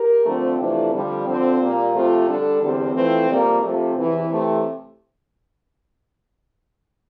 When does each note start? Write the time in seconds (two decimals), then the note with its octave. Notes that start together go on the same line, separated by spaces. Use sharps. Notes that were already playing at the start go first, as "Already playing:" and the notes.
Already playing: G4 A#4
0.26 D3 F3 A3 C4
0.59 F2 C3 E3 A3 D4
0.93 F2 D3 G3
1.27 D3 F3 C4
1.60 A#2 G3 A#3
1.94 C3 F3 A3 C4 F4
2.27 D3 G3 D4 A4
2.61 E2 D3 G3 C4 G4
2.94 F2 E3 A3 C4
3.28 F2 C3 G3 A#3
3.62 C3 F3 A3 C4
3.95 E2 C3 E3
4.28 C3 E3 A3 C4